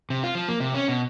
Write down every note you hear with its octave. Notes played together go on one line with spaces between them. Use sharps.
C3
F4
F3
A#3
C3
C#4
B2